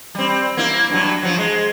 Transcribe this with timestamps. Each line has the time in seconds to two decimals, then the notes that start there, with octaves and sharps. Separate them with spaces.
0.15 G3 C4
0.57 A#3 E4
0.90 G2 F#3
1.23 F3 F#3
1.38 G#3